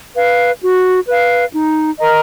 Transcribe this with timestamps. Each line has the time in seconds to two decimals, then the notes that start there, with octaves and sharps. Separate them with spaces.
0.16 B4 F5
0.62 F#4
1.08 B4 F5
1.54 D#4
2.00 A#4 D#5 A#5